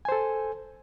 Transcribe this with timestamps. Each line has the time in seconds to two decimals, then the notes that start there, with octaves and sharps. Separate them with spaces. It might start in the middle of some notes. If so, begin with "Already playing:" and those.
0.05 G#5
0.09 C5
0.12 A4